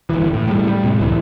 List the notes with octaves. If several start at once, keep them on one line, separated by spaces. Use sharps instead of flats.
G1 E3
A2
A2 G3
G3
A2 C3 G3 G#3
F#1 C#2 G#2 E3